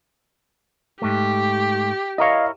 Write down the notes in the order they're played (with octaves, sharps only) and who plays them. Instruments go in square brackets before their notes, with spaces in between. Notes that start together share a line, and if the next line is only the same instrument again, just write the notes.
[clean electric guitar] G#2 A3 [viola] G4
[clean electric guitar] E4 A#4 C#5 [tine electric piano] D#5 F5